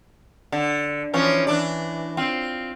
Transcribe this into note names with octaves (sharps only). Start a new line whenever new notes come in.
D3
E3 F3 C#4
E3 D4 D5
C4 F4